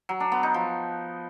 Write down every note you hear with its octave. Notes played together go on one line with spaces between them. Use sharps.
F#3
D4
B3
D#4
F3